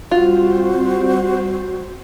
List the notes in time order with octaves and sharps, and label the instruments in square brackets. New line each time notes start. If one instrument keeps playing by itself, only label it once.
[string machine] G3 C4 C5 [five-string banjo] F4 [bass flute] F#4